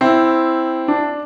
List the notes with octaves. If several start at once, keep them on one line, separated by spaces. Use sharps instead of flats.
C4 E4
D4